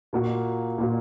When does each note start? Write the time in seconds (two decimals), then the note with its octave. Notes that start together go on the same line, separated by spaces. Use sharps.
0.13 A#2 A#3 F#4
0.78 A#2 A#3 F#4